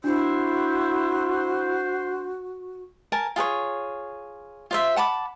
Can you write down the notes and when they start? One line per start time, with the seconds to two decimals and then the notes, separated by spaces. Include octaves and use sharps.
0.04 D4 E4 F#4 C5
3.12 A#4 G#5 A5
3.36 F4 G#4 B4 C#5
4.71 F4 C5 E5
4.96 F#5 A5 B5 D6